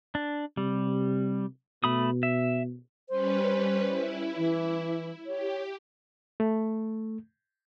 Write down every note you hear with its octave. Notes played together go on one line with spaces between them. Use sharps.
D4
C3 G3
B2 A3 B5 D#6
E5
G3 C#4 B4 C5
E4
E3
G4 C#5
A3